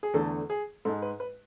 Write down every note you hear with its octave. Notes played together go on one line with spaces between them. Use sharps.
G#4
E2 D3 A3 A4
G#4
G#2 G#3 A4
B4
B4